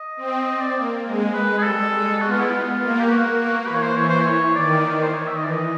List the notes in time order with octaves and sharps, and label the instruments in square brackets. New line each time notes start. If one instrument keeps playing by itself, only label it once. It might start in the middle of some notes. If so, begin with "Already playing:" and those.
Already playing: [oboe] D#5
[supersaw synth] C4
[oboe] D#5
D5
[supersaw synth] A#3
G#3
[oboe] B4
G#4
[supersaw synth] G3 [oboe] A4
[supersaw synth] G#3
[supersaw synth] B3 [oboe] F#4
[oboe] F4
E4
F4
[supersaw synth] A#3
[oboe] G4
F#4
[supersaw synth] A#3
[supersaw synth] E3 [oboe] B4
[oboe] C#5
C5
[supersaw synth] E3 [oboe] C#5
[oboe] C5
C#5
[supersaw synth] D#3 [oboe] D5
[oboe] C5
C#5
E5
D#5
[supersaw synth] E3 [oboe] D5
[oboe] D#5